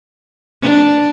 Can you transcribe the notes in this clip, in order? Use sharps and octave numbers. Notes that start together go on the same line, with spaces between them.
D4